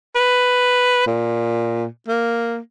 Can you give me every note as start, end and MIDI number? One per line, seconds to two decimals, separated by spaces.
0.16 1.05 71
1.07 1.86 46
2.09 2.58 58